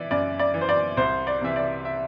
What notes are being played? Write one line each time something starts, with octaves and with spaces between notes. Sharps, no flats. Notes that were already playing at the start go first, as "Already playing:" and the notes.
Already playing: E3 D5 E5
F#2 D5
D5
E3
C5
D5
C2 C5
D5
C3 E3 E5
D5
E5